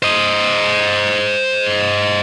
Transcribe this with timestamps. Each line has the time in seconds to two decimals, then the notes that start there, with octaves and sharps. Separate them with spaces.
0.03 C5 D#5